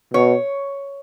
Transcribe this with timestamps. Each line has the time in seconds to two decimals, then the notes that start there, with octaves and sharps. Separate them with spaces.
0.13 B2 C#5